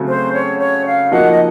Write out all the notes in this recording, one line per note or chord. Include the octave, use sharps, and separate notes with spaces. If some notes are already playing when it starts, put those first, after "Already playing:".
Already playing: C#3 F#3 A3 C4 F#4
C5
C#5
C#5
F5
F3 A#3 D#4 F#4 F#5
D#5